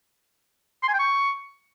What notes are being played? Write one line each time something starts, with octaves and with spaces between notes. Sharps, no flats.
C6
G#5
G5
C#6